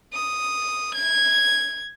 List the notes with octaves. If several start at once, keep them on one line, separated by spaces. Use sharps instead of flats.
D#6
G#6